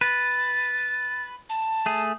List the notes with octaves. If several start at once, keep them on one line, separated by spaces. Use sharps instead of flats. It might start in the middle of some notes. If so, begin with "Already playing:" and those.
B4 A6
A5
A3 G#4